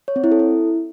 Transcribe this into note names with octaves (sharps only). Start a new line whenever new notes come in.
C#5
C4
E4
A4
E4